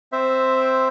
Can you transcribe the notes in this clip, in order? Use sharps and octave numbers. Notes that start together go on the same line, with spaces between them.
C4 C5 E5